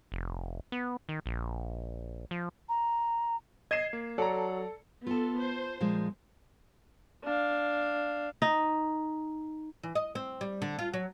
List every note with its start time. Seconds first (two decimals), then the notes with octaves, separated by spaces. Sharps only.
0.12 F1
0.72 B3
1.09 D#3
1.26 A#1
2.31 F3
2.69 A#5
3.71 D#5 G#6 C7 D#7 E7
3.93 A#3
4.18 F#3 A4 D5 A#5
5.07 B3 F4 A4 A5
5.40 C5
5.80 A#2 F3 G#3
7.24 D4 F5
8.42 D#4
9.83 E3
9.95 D#5
10.15 C4
10.41 G3
10.62 D3
10.79 F4
10.94 F#3